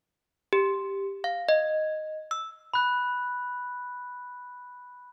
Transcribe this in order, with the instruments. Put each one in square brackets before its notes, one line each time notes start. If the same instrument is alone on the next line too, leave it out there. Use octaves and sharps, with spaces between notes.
[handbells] G4
F5
D#5
E6
[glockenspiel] B5 F#6